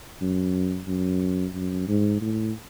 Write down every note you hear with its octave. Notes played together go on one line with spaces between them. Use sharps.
F#2
F#2
F#2
G#2
A2